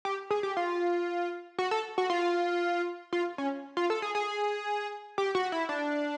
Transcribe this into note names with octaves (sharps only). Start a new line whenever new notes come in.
G4
G#4
G4
F4
F#4
A4
F#4
F4
F4
C#4
F4
A4
G#4
G#4
G4
F#4
E4
D4